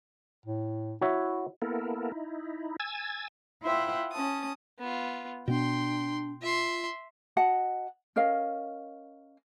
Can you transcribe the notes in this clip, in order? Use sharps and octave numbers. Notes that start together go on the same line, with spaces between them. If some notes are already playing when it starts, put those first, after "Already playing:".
A2
E4 F#4 C#5 E5
A#3 B3 E4 A4 A#4
D#4 E4
G#5 E6 G#6 A6
E4 F4 C5 E5 F#5 G5
C#4 A5 D#6
B3 F4
B2 B3 D4 G5 C6
F4 E5 C6
F#4 D#5 F#5 A5
C#4 A#4 D#5 F5